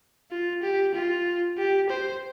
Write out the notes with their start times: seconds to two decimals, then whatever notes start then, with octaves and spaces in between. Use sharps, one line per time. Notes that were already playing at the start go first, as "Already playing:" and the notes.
0.31 F4
0.63 G4
0.94 F4
1.58 G4
1.90 C5